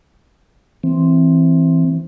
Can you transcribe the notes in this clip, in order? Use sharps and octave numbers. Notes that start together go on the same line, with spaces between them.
E3 C4